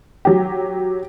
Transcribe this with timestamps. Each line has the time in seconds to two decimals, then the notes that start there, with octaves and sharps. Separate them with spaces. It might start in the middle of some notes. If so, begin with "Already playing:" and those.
0.25 F#3 G4